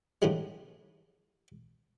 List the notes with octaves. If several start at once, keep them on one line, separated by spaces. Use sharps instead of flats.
A2 D3 E3 F3 G3 G#3